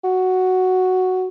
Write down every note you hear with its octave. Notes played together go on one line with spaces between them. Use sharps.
F#4